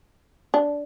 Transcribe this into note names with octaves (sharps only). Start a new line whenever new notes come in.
D4